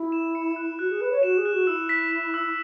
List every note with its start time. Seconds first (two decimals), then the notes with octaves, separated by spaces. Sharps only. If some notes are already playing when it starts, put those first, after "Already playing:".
Already playing: E4
0.12 E7
0.35 C#7
0.56 F#6
0.79 F#4 F#6
0.90 G#4
1.01 B4 F#6
1.12 C#5
1.23 F#4 E7
1.37 G#4
1.45 F#6
1.53 F#4
1.67 E4 E6
1.89 B6
2.12 B6
2.34 E6